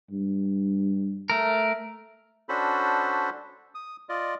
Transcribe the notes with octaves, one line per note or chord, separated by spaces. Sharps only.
G2
A3 A#4
C#4 D4 F#4 A4 C5 B5
D#6
F4 D5 D#5